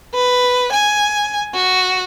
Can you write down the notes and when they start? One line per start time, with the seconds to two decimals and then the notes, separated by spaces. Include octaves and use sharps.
0.14 B4
0.72 G#5
1.53 F#4